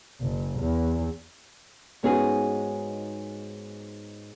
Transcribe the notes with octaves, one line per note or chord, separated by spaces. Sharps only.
F#1
E2
G#2 B3 C#4 D#4 F#4 G#4